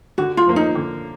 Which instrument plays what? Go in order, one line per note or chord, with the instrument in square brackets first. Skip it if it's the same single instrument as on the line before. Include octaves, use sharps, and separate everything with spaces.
[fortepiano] D3 [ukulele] F#4
[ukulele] F4
[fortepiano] F3 A#3
[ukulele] D#4
[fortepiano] D3